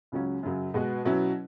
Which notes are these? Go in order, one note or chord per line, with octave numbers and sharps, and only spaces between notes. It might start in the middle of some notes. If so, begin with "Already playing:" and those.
C#2 C#3 F#3 C#4
F#2 C#3 F#3
B2 G#3 B3 F#4
B2 F#3 C#4 E4